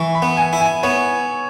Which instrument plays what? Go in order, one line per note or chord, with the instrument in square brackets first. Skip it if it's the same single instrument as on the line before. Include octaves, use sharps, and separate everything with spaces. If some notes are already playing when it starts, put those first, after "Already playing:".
Already playing: [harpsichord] E3 [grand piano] C#6
[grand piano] B5
[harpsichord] B3
[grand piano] G#5
[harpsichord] E4
[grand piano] G#5
[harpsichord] B3 [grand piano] C#5